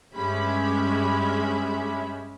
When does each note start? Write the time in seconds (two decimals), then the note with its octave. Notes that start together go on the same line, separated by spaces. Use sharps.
0.14 G2 G#3 C#4 G4 E5 B5